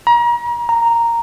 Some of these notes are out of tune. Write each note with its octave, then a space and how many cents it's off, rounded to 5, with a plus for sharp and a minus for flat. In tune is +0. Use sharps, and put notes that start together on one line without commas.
A#5 +35
A#5 -5